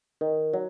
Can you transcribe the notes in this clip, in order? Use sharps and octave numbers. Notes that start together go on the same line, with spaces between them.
D#3
F#3